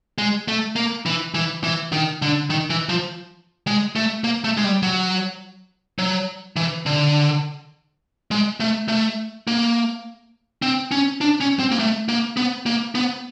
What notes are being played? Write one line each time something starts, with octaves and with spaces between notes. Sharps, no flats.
G#3
A3
A#3
E3
E3
E3
D#3
D3
D#3
E3
F3
G#3
A3
A#3
A3
G#3
G3
F#3
F#3
E3
D3
G#3
A3
A3
A#3
C4
C#4
D4
C#4
C4
A#3
A3
A#3
B3
A#3
B3